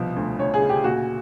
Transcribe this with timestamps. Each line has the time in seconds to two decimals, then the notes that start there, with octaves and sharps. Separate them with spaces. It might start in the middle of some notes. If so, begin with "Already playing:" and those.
Already playing: C2 B2 F3
0.16 D2
0.39 D2 C#5
0.54 G#4
0.61 C#3
0.69 G4
0.84 A#2 F#4